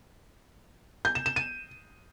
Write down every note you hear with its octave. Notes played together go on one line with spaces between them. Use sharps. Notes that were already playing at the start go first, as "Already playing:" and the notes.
G6
E7
E7
D#7